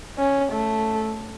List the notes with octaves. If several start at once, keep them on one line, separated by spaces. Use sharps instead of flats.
C#4
A3